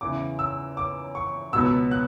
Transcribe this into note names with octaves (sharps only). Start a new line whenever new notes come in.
E2 C#3 E3 D6
E6
D6
C#6
C#2 B2 F#3 B3 E6
F#6